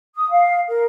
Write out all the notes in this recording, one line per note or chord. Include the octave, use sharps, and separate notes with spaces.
D#6
F5
A#4